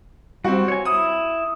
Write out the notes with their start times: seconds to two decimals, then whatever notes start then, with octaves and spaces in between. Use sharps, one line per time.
0.44 G3 C4 F#4
0.68 C#5 G#5
0.85 E4 D#6